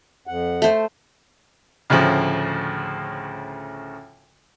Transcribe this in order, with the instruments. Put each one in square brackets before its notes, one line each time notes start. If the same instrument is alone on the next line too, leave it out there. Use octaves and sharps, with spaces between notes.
[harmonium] F2 F#5
[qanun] A3 C5
[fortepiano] D2 A2 C#3 F3